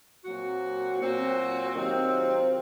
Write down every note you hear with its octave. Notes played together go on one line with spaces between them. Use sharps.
A#2 F#3 C4 F#4
A#2 F#3 C4 F#4
C3 D#3 F#3 C4 F4